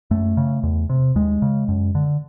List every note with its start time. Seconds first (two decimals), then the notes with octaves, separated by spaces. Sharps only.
0.11 F#2 A3
0.37 C#3
0.63 E2
0.90 C3
1.15 D#2 G#3
1.42 C#3
1.68 F#2
1.95 D3